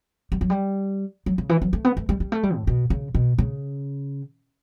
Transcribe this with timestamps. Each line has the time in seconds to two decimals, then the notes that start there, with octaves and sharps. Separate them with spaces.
0.32 G3
0.41 F#3
0.50 G3
1.26 F#3
1.38 C#3
1.49 E3
1.62 F#3
1.73 A3
1.85 B3
1.97 A3
2.09 G3
2.20 G3
2.32 A3
2.43 G3
2.55 A2
2.67 B2
2.90 C#3
3.15 B2
3.38 C#3